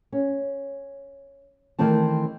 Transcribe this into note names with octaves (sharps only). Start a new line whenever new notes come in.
C#4
D#3 E3 A3 C4 A5